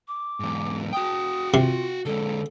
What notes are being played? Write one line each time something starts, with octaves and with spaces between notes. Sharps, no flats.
D6
E2 G#2
F#4 G5 D#6
C3 F4
D3 G#3 A4